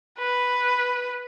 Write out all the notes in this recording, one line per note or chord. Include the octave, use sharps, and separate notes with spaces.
B4